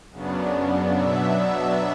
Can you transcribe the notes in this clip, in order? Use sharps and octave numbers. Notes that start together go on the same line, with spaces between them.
F#2 C#3 F#3 B3 D4
B2 F#3 B3 D4 E5
E5